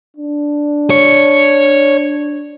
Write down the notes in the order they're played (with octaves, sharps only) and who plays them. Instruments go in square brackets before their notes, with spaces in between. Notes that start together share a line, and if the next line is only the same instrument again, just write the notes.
[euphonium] D4
[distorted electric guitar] C#5